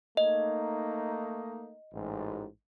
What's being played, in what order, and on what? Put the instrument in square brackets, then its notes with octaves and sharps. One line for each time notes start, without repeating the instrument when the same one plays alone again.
[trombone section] A3 A#3 D#4 [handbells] D#5
[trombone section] A1 G#2